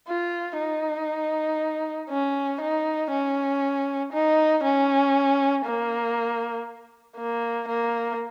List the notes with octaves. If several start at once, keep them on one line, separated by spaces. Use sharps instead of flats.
F4
D#4
C#4
D#4
C#4
D#4
C#4
A#3
A#3
A#3